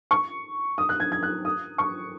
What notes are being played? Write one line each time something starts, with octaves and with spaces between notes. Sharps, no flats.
C#6
D#6
F#6
G#6
G#6
F#6
D#6
C#6